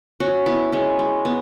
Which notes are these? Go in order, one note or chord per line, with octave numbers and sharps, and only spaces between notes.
C#4 F#4
B3 E4
G#3 C#4
G#3
B3